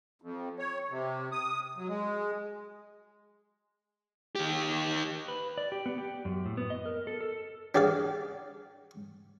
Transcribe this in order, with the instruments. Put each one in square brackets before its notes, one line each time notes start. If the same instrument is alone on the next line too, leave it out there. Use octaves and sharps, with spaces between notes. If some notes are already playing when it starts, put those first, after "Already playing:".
[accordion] F2
C#5
C3
D#6
F#3
G#3
[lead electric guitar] D#3 G4
[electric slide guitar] B4
D5
G4
B3
G4
F#2
A2
B3
D#5
A#4
A4
A4
[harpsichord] D4 G4 G#4 D5 F5